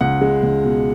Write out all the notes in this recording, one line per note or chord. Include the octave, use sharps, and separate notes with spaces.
C#2 F#5
G#3
C#2
B2